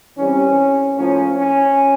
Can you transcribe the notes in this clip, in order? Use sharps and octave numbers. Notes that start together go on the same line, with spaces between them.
E3 G3 C4 C#4
A2 F3 A#3 C#4
C#4